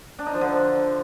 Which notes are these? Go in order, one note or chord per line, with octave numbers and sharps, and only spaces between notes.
D4
D#4
F3
D3